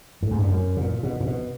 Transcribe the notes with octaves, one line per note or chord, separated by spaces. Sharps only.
A2
G#2
G2
F#2
B2
A#2
B2
A#2
B2